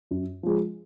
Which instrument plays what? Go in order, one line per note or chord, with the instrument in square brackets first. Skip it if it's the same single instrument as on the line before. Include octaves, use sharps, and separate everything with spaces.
[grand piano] F#2
F3 G#3